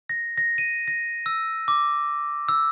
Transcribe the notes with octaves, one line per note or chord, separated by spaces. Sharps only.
A#6
A#6
D#7
A#6
E6
D6
E6